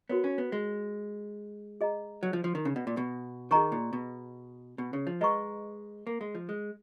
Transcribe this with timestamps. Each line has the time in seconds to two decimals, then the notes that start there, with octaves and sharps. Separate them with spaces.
0.09 B3 F#4 A#4 C#5
0.24 C#4
0.38 B3
0.52 G#3
1.81 G#4 D#5 A#5
2.23 F#3
2.33 F3
2.44 F3
2.55 D#3
2.65 C#3
2.76 B2
2.87 A#2
2.97 B2
3.51 D#3 G#4 D#5 A#5 C#6
3.72 A#2
3.93 B2
4.78 B2
4.93 C#3
5.07 F3
5.21 G#3 B4 D#5 A#5 C#6
6.07 A#3
6.21 G#3
6.35 F3
6.49 G#3